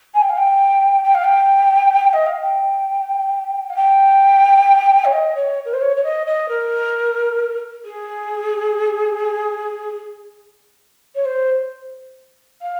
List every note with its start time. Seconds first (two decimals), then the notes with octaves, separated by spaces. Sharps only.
0.14 G#5
0.21 G5
0.29 F5
0.37 G5
1.03 G5
1.14 F5
1.24 G5
2.13 D#5
2.26 F5
2.41 G5
3.69 F5
3.76 G5
5.04 C#5
5.12 D#5
5.35 C#5
5.65 A#4
5.73 C5
5.81 C#5
5.96 C#5
6.03 D#5
6.26 D#5
6.48 A#4
7.85 G#4
11.15 C#5
11.25 C5
12.61 F5